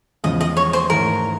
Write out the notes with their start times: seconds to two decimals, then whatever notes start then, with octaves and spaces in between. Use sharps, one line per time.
0.24 E2 C#3 F3 G#3 D#5
0.41 D#5
0.57 C#5
0.73 C5
0.90 G#2 E3 A3 C#4 A#4